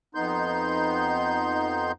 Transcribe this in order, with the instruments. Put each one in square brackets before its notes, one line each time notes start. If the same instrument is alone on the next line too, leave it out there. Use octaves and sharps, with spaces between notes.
[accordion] F2 B3 D#4 C6 G6